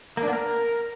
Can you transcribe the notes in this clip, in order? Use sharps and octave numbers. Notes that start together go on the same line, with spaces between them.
A#3
D4
B3
A#4